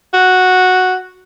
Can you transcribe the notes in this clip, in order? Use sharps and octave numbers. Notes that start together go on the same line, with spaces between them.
F#4